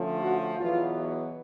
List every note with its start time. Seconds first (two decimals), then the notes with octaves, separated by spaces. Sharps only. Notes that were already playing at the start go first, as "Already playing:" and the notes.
Already playing: D3 F3 A3 C#4
0.21 F#4
0.58 E2 B2 F#3 B3 F4